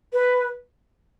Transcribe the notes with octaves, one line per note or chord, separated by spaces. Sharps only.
B4